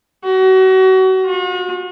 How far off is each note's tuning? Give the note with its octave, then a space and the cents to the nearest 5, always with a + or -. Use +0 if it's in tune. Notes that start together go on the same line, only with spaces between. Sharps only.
F#4 +30
F#4 -45